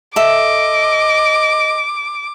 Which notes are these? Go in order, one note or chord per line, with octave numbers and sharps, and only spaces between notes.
A4 D#5 E5 D6